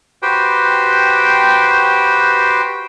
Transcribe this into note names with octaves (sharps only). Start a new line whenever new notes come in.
F#4 G4 B4 C5 G5